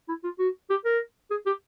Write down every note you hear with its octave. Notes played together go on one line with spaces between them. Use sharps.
E4
F4
F#4
G4
A#4
G#4
G4